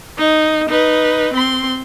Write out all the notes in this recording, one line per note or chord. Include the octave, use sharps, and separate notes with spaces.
D#4
D#4 B4
C4 C6